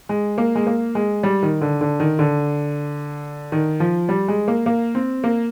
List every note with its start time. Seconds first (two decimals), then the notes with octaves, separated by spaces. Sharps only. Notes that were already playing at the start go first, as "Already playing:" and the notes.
0.09 G#3
0.38 A#3
0.55 G#3
0.67 A#3
0.95 G#3
1.23 G3
1.43 D#3
1.61 D3
1.81 D3
2.00 D#3
2.19 D3
3.52 D#3
3.80 F3
4.09 G3
4.28 G#3
4.48 A#3
4.66 A#3
4.95 C4
5.24 A#3